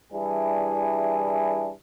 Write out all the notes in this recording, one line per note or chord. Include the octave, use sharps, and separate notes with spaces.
E3 G3 D4 E4 G#4